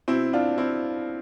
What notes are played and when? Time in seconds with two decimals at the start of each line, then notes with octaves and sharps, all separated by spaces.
0.08 B2 C4 E4
0.33 D4 F4
0.58 C4 E4